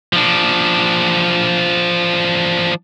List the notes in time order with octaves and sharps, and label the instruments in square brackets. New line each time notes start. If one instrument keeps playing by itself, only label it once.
[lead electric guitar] F3 D4